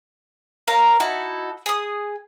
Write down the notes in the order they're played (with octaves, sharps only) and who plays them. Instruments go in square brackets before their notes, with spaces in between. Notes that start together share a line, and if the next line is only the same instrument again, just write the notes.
[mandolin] A#4 C#5 F5 A#5
D#4 E4 F#4 A4
G#4 D#6